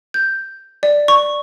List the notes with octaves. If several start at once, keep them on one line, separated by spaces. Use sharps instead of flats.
G6
D5
C#6